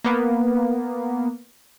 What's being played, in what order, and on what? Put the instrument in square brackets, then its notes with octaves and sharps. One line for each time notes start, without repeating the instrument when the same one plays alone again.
[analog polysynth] A#3 B3